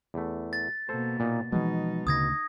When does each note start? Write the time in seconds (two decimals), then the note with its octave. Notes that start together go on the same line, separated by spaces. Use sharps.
0.14 E2 A3
0.53 A6
0.89 B2 A#3 A4 C5
1.20 A#2 D#4
1.52 B2 E3 F3 G#3 D#4
2.07 D2 C#3 D#6 G#6 A#6